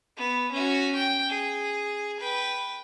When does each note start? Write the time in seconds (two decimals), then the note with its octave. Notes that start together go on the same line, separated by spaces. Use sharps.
0.17 B3
0.51 C#4 F#4
0.95 G5
1.29 G#4
2.20 B4 G5